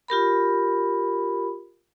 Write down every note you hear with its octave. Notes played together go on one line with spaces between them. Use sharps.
F4 G4 A#4 B5